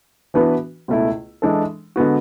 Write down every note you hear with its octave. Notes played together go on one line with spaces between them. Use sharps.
E3 B3 D4 F#4 B4
C#2 B2 A3 E4
E3 G#3 D4 A4
D3 G#3 B3 F#4